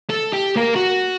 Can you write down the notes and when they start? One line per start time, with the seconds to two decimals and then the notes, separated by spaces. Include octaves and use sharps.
0.10 A4
0.33 G4
0.56 A#3 A#4
0.75 F#4